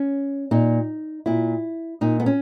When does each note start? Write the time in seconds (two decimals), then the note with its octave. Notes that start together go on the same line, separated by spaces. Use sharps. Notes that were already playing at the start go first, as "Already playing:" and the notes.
Already playing: C#4
0.51 A#2 D#4
1.26 A#2 E4
2.01 A#2 D#4
2.20 B3
2.26 C#4